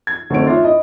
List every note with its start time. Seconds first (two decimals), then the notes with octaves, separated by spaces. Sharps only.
0.07 G#6
0.30 D2 D#3 A3 C4 C#5 D7
0.46 D4 F4 C#5 E5
0.64 E4 D#5